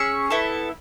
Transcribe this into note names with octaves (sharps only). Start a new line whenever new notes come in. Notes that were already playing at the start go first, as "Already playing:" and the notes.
Already playing: C#4 G#4 C#6 E6
B3 E4 A4